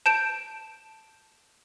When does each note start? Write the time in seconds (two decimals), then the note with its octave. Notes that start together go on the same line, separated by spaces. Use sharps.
0.06 A5 G6 D7 E7